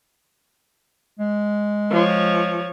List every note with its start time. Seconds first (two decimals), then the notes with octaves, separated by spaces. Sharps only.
1.19 G#3
1.92 F3 C#5